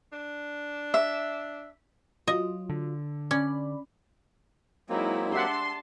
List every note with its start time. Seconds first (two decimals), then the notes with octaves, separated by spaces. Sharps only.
0.12 D4
0.94 E5
2.28 F#3 F4 D#5
2.69 D3
3.31 C#4 D5 B5
4.89 F#3 G#3 A#3 C4 D#4 E4
5.32 D4 G4 E5 F#5 A5 C6